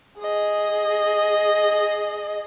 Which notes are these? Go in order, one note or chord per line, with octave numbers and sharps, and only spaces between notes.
G#4 D#5